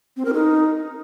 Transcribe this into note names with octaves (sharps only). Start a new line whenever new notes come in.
C4
A#4
D#4